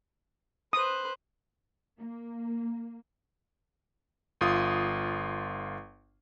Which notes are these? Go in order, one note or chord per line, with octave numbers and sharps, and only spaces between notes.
B4 C5 D#6 F#6
A#3
G1 F4 D#6